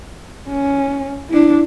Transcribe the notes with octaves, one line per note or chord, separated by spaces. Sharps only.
C#4
D4 E4